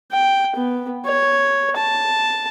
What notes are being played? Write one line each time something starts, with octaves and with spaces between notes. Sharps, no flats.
G5
B3
C#5
A5